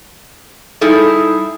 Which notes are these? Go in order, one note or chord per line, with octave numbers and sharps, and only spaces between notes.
G3 D#4 E4 G#4 A4